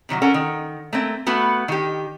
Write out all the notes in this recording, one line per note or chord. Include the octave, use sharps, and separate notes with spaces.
C3 D#3 E3 F#3
C#4 A4 A#4 F#5
D#3
A3 A#3 C4
A3 B3 F#4
D#3 G4